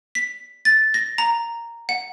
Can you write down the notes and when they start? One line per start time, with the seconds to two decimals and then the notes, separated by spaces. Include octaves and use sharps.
0.15 B6
0.65 A6
0.94 A#6
1.18 A#5
1.89 F#5